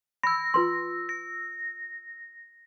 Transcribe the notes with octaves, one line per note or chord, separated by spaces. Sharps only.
B5 E6 A#6
F4 B4 C6
A#6